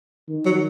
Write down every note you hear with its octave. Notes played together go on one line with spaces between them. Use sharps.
D#3
F#3